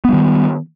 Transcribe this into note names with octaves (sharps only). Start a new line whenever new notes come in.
D#3 G3 B3